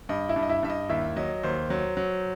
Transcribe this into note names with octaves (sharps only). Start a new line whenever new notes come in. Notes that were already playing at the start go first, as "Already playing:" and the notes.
G2 D#5
E4 E5
G2
D#5
E4 E5
G2 E5
D#5
D#2 E4 E5
F#3 D#5
D#2 C5
F#3
F#3